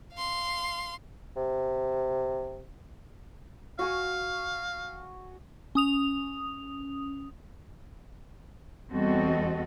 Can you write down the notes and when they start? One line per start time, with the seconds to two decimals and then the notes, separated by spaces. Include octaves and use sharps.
0.14 F5 C6
1.37 C3
3.79 F#4 F5 G#5 C#6
5.75 C#4 D#6 F7
8.91 E2 G3 C4 F#4 A4 D#5